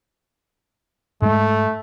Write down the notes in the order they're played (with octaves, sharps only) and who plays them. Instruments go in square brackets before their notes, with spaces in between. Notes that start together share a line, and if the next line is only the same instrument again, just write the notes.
[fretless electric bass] G#2 G#3 [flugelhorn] A3